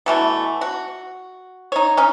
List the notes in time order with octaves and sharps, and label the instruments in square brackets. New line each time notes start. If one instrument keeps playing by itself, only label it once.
[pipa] B2 E3 A3
F#4
D#4 C#5
C#4 D#4